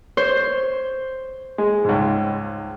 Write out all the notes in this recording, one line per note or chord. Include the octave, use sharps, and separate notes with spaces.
C5 C#5
G#3
C#2 G#2